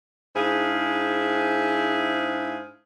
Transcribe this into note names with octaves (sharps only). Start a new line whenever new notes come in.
G#2 D4 E4 G#4 C5 F5